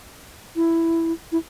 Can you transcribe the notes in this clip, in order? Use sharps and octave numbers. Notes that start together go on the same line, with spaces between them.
E4
E4